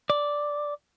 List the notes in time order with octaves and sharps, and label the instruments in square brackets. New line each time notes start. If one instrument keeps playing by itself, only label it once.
[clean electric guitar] D5